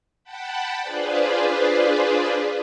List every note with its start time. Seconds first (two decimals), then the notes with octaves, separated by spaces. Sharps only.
0.24 F#5 G5 A5 B5
0.81 D4 F4 G#4 B4 C5 D5